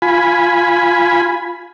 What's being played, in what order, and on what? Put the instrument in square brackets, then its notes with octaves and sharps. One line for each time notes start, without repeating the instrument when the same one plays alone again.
[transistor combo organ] F4 G#5 B5